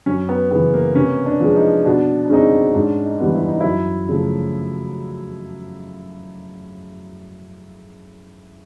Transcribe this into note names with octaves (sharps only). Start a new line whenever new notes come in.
F#2 C#4
B3
C#3 E3 B3
A#3
C3 C#4
D4
F3 G#3
D#4
B2 D4
D4
G#3 C4 C#4 D#4
G#2 D4
D#4
E3 G3 B3
E4
D#4
F#2 E4
C#3 F3 A3